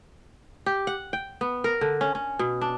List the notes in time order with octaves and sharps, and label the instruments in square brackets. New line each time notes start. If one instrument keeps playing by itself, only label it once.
[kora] G4
F#5
G5
B3
A#4
D3
C#4
C#4
B2
D4